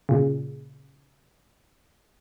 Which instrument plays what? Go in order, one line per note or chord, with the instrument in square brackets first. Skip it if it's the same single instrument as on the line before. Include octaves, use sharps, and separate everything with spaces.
[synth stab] A#2 C#3